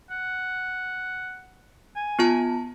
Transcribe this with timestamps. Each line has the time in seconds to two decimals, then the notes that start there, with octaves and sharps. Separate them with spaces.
0.10 F#5
1.96 G#5
2.19 B3 F4 A5